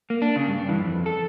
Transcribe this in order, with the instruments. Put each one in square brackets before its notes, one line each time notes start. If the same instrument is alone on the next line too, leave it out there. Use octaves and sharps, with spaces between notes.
[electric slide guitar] A#3
D4
C#3
G2
E3
F2
A4